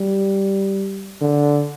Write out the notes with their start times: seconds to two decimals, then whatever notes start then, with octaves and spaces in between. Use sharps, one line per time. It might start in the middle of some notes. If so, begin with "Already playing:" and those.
Already playing: G3
1.21 D3